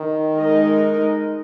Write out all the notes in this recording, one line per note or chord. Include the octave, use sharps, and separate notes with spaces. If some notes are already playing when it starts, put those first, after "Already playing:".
Already playing: D#3
G#3 D#4 A#4 D#5